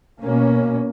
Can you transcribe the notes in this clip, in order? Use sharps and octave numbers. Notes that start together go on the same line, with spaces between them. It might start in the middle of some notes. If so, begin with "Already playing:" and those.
B2 A#3 C#4